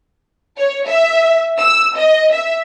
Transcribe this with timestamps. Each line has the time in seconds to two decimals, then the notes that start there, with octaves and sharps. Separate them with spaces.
0.58 C#5
0.87 E5
1.58 E6
1.96 D#5
2.32 E5